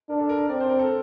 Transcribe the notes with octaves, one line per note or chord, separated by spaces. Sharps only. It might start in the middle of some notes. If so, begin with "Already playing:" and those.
D4 A#4
A4
A#4
A#4
C4 D5
C5
A#4
A4